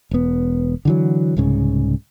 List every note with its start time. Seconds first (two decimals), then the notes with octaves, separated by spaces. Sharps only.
0.11 E1 B3
0.85 D3 E3 F#3
1.37 C2 G#2 C#3